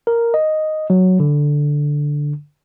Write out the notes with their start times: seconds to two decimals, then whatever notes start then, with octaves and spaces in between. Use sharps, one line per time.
0.07 A#4
0.34 D#5
0.90 F#3
1.20 D3